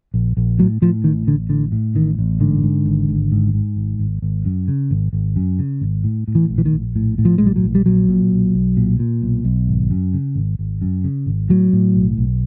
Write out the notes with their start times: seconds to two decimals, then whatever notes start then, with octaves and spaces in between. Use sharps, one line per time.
0.14 A#1
0.37 A#1
0.59 A2 F#3
0.82 A2 F3
1.04 A1 D#3
1.27 A1 D3
1.50 A2 D3
1.72 A2
1.95 A1 D#3
2.19 A1
2.40 G#2 D3
2.63 G#2
2.86 G#1
3.09 G#1
3.32 G#2
3.54 G#2
3.76 G#1
3.99 G#1
4.22 G#1
4.45 F#2
4.68 C#3
4.91 G#1
5.13 G#1
5.36 F#2
5.59 C#3
5.81 G#1
6.04 A2
6.28 A2
6.35 E3
6.49 A#1
6.58 E3
6.65 D#3
6.73 A#1
6.96 A2
7.18 A2
7.25 F3
7.38 A#1 G#3
7.46 G3
7.56 F#3
7.64 A#1
7.75 G3
7.86 A#2 F#3
8.09 A#2
8.31 B1
8.54 B1
8.77 A#2
8.99 A#2
9.22 B1
9.45 B1
9.67 G#1
9.91 F#2
10.14 C#3
10.36 G#1
10.59 G#1
10.81 F#2
11.04 C#3
11.26 G#1
11.49 A2 F#3
11.73 A2
11.95 B1
12.17 B1